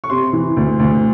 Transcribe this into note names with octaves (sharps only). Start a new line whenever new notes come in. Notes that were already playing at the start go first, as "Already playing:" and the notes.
C#6
C3 C6
E3
D2
D2